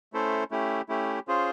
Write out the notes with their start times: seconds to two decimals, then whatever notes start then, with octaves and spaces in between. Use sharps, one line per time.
0.13 A3 C#4 E4 A4 C5
0.51 A3 C#4 E4 G4
0.89 A3 C#4 E4 G4
1.28 C#4 F4 G#4 C5